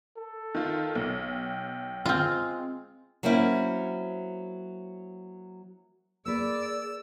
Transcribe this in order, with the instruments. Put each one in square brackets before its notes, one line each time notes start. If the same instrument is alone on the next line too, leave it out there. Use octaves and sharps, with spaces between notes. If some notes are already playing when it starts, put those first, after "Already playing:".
[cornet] A4
[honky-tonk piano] D#3 F4
B1
[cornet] G5
[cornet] G#3 [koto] C4 F4 [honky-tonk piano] F6
[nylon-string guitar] F#3 A#3 C4 C#4 E4
[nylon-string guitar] A#3 B4 [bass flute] G#4 [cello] D5 [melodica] E6